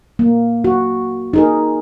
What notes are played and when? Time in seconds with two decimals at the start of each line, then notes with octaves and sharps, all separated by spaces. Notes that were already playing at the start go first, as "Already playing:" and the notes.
0.19 A#3
0.64 F#4
1.33 D#4 G#4 A#4